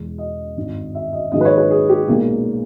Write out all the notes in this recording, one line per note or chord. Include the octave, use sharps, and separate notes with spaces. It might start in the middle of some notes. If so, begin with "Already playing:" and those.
Already playing: E2 B2 G#3
D#5
G#1 G2 D#3
E5
D#5
A#1 G#2 D#3 G#3 D#5
B4
C#5
B4
G#4
G4
B1 A#2 G#3 A#3